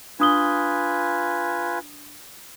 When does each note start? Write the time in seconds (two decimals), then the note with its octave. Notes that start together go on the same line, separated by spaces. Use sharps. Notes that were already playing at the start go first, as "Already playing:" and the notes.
0.20 D4 F4 B4 G#5 D#6 G7